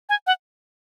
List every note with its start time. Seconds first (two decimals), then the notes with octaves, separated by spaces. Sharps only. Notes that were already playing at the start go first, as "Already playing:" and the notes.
0.09 G#5
0.27 F#5